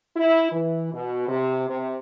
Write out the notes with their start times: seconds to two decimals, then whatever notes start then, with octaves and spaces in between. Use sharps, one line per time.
0.16 E4
0.52 E3
0.93 B2
1.28 C3
1.69 C3